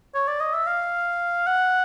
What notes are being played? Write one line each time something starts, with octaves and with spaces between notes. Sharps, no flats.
C#5
D5
D#5
E5
F5
F#5